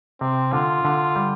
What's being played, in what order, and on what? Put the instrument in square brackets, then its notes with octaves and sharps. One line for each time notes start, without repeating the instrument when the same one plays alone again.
[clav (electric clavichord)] C3 [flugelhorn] C4
[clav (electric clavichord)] D3 [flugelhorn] F4
[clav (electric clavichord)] D3
G3